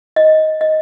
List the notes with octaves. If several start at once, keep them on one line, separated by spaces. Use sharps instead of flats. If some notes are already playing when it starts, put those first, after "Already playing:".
D#5
D#5